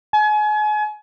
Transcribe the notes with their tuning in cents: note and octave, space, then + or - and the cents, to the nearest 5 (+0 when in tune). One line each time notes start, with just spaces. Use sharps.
G#5 +35